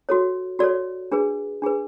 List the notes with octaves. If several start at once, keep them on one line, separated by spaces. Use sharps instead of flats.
F#4 A4 C#5
F#4 A4 C#5 D5
D4 G#4 B4
D4 G#4 B4